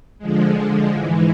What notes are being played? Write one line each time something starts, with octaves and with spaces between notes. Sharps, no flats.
D3 F3 G#3
G#2 E3 G#3